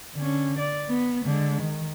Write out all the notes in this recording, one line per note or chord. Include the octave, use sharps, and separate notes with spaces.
D3 C#4
D5
B3
D3 G#3
D#3